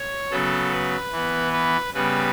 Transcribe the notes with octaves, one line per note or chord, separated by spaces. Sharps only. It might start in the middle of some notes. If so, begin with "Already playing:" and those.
Already playing: C#5
C#3 F#3 B3 A4
B4
E3 B3
B4
C#3 G3 B3 B4